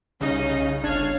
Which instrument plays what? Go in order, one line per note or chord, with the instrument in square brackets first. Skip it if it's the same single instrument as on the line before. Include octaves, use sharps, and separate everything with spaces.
[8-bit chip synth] C2 D#5 [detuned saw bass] C#3 [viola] C#4 D#4
[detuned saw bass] G1 [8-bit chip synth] D4 G#6 [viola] C#5 F5